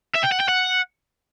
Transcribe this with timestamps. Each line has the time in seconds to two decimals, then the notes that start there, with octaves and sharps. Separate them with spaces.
0.15 E5
0.23 G5
0.31 F#5
0.40 G5
0.48 F#5